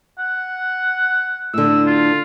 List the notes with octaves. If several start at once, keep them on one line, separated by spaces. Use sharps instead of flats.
F#5
A2 D3 E6
F4